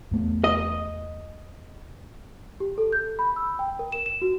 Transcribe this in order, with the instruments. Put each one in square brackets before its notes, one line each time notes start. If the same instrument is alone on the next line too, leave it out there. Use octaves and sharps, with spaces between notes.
[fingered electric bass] E2 A3 B3
[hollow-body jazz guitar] D#5
[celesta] G4
A4
G6
B5
E6
G5
A#4
E7
E7
F#4